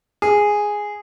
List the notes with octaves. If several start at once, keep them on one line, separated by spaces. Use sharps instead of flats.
G#4